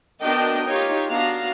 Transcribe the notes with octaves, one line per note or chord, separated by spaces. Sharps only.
B3 D4 F#4 A#4 D#5 G5
D#4 F4 G4 C#5
B3 D4 F#4 F5 A#5